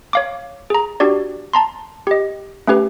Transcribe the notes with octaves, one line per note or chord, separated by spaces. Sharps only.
C#5 F5 D6
G#4 A#5
D4 F#4 G4 D5
A5 A#5 C6
G4 D#5
A3 C#4 G4 B4